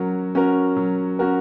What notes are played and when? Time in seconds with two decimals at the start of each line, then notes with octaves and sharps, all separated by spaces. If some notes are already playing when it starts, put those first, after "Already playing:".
Already playing: F#3 C#4 F#4 A#4
0.35 C#4 F#4 A#4
0.77 F#3
1.19 C#4 F#4 A#4